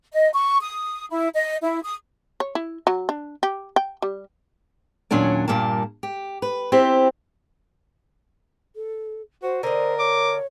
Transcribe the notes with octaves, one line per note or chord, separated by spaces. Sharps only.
D#5
C#6
D#6
E4
D#5
E4
D#6
C#5
E4
F#3
D4
G4
G5
G3
D#2 A#2 F#3 C#4 D4 D5
G2 A#2 G3 A#3 A5
G4
B4
C4 E4 G4 C5
A4
F#4 C5
D3 A#4 C5 D#5
C#5 D6